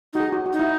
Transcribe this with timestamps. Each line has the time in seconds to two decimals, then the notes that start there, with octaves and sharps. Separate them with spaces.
0.13 D#4 F#4
0.20 G#4
0.32 F#4
0.46 F#4
0.53 D#4
0.59 E4